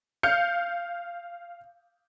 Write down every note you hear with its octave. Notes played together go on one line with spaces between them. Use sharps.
F5 F6 G6 C#7